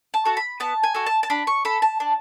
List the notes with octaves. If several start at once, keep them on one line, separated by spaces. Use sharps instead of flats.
A5
F#4 A4
B5
B3 A5
G#5
F#4 A4
A5
A5
D4 B5
C#6
A4 B5
A5
D4